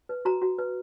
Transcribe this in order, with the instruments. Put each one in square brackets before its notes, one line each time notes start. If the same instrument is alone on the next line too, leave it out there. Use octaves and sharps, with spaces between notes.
[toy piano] B4
F#4 A#5
F#4
B4